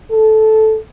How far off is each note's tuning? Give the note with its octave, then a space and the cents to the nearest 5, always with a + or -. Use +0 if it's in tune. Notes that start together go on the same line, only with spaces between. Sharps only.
A4 -10